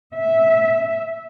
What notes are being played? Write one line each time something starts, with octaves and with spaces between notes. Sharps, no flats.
E5